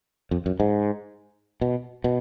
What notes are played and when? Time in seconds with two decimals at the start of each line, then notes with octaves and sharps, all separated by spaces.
0.31 F2
0.46 F#2
0.60 G#2
1.61 B2
2.04 B2